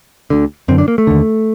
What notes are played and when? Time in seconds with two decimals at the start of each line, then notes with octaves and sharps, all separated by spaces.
0.30 D2 D3
0.68 F#2 D3 C4
0.78 D4
0.88 A#3
0.98 A3
1.07 D#2 D3